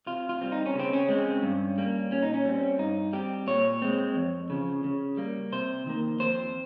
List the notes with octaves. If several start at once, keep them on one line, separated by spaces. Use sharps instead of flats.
C3 F4
F4
G3 C4
D#4
C#4
C#3 C4
C#4
G#3 C4
G2
G3 A#3
A#2 C#4
D#4
C#4
G3 C4
G2 D#4
G3 C4 G4
A#2 C#5
G#3 C4
F2
C#3 F3
C#3
G3 A#3
C3 C5
D#3 A#3
F2 C5